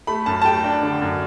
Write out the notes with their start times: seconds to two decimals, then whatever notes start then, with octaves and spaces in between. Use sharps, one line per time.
0.07 A3 B5
0.26 F#2 A5
0.42 A5
0.45 A3 G5
0.64 D4
0.82 D3
1.02 F#2